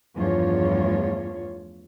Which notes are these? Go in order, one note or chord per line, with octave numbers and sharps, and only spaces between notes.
E2 G2 F3 A3 F4 C#5